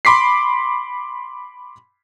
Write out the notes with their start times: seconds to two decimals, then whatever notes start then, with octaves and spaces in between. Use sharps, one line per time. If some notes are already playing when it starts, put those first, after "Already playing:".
0.05 B5 C6 D6 B6 C7